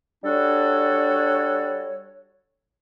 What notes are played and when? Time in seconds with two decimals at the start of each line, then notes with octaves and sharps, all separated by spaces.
0.24 G3 D4 F#4 A4 C#5